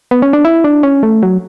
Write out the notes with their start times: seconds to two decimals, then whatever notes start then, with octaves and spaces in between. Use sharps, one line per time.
0.11 B3
0.22 C#4
0.33 D4
0.45 E4
0.64 D4
0.83 C#4
1.03 A3
1.23 F#3